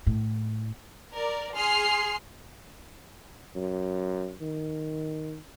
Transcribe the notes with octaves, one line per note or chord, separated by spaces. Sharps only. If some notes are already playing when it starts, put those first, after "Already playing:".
A2
A#4 D5
G#4 C6 F6 C7
F#2
D#3